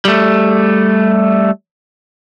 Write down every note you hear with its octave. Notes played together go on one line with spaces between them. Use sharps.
G3 A3